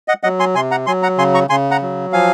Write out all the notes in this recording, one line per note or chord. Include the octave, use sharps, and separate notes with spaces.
D#5 F#5
F#3 D#5 F#5
G#5 C6
C3 G#5 C6
F#5 A#5
F#3 G#5 C6
F#5 A#5
C#3 G#5 C6
A#5 C#6
C#3 G#5 C6
F#5 A#5
F#3
F3 F5 G#5